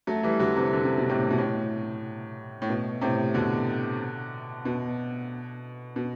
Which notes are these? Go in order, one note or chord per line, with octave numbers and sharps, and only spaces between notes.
F#3 A3
E3 G3
D3 F#3
C3 E3
D3
C3
B2
A2 C3
B2
A2
A2
B2
A2 C3
B2 D3
B2
B2